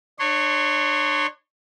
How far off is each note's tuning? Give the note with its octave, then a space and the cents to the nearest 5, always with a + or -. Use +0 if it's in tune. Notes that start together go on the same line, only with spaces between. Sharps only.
D4 +35 C#5 -10 C6 -20